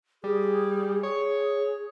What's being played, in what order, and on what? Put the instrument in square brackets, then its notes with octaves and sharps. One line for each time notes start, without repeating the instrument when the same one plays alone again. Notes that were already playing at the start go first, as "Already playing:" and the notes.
[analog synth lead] G3 [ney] G#4
[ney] G#4 [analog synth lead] C#5